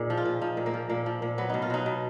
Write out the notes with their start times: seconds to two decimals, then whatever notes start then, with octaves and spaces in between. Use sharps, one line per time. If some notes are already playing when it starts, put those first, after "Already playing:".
Already playing: A#2 D#4 G#4
0.10 F3
0.17 F4
0.25 A#2
0.41 F3 D#4
0.57 A#2
0.66 A#3
0.74 F3
0.90 A#2 A#3
1.06 F3
1.22 A#2
1.38 F#3 B3
1.50 B2 D#4
1.62 F4
1.70 F#3 D#4
1.86 B2